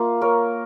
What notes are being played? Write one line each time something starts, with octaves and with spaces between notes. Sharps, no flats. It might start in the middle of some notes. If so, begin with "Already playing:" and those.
Already playing: A#3 F4 F5
A#4 C#5